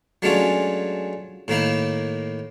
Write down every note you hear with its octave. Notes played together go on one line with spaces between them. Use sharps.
F#3 G#3 A3 C#4 D4 F4
A2 D#3 A#3 E4